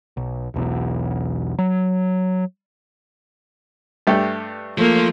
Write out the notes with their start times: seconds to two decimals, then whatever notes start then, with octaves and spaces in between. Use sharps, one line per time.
0.17 B1
0.54 E1 B1 E2
1.58 F#3
4.07 G2 A3 G4
4.78 F3 A3 A#3